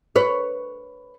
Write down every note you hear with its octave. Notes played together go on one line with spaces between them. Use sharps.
B4 C#5